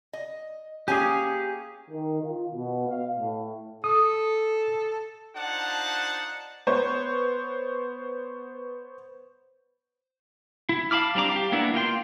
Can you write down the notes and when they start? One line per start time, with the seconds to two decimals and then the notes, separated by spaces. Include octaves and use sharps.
0.13 D#5
0.88 A#3 C#4 G4 G#4 G#5
1.90 D#3
2.23 F4
2.54 B2
2.88 F5
3.19 A2
3.84 A4 D#6
5.35 D4 D#4 F4 C5 F#5 A5
6.67 B3 C5 C#5
10.69 E4
10.91 F5 A5 B5 D6 F6
11.15 G3 C4 D4 A#5 D6
11.32 G4 F5
11.52 A#3 B3 D4 E4
11.74 A#3 F4 G5 C6